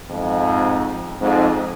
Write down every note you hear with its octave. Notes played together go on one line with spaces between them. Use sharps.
F2 G#2
F2 G#2